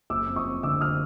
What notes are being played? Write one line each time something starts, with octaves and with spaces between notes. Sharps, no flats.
F#1 D6 E6
F2
C#6 D#6
F2
D3 D6 E6
D#6 F6